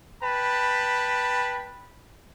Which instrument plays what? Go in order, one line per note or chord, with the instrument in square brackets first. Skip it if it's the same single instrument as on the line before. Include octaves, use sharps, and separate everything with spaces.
[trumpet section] B4 G5 A5 B5